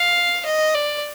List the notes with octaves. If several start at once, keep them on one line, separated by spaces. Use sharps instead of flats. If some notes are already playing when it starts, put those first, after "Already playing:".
Already playing: F5
D#5
D5